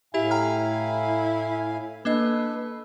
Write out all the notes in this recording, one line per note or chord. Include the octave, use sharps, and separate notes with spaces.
A2 E4 G4 F5 G#5
G5 A#5 F6
A#3 D4 A4 B4 D#5